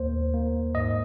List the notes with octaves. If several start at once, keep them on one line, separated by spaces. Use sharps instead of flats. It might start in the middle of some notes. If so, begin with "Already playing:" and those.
Already playing: D#2 A#3 C5
A#3
G#2 D#5